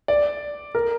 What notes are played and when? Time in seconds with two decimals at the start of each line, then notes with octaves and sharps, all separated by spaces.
0.08 D5
0.75 A#4